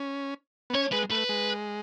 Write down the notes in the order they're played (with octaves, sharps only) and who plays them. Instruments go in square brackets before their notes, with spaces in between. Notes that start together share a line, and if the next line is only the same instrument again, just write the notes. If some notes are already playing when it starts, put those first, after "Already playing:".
Already playing: [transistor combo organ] C#4
B3
[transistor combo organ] C#4 [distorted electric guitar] C#5
[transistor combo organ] G#3 [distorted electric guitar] B4
[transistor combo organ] A3 [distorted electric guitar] B4
[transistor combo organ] G#3